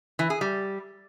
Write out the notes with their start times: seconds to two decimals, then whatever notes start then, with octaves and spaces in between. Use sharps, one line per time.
0.19 E3
0.30 G#4
0.41 G3